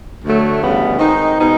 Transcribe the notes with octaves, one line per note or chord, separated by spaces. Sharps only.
D2 D3 F#3 A3
D2 C#3 E3 G3 B3
D#3 G#3 C4 D#4
B2 G#3 B3 D#4